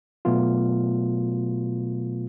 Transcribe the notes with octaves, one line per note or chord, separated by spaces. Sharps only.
B2 F#3 A3 B3 F4